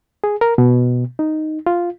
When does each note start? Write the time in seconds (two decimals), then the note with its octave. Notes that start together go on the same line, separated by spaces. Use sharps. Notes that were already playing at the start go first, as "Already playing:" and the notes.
0.24 G#4
0.41 A#4
0.58 B2
1.19 D#4
1.66 F4